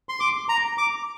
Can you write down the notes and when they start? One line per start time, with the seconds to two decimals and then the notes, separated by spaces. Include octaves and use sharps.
0.09 C6
0.20 D6
0.49 A#5
0.78 D6